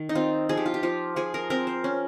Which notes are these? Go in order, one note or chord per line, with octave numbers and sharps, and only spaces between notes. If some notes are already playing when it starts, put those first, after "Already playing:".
Already playing: D#3
D#4
C4 F4
F3 G#4
G4
F4
G4
F3 F4
F3 G#4
A#4
C4 A#4
C5
C#4